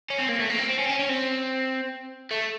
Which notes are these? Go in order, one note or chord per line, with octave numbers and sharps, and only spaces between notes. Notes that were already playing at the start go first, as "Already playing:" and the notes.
C#4
C4
A#3
A3
A#3
C4
C4
C#4
C4
C#4
C#4
C4
A3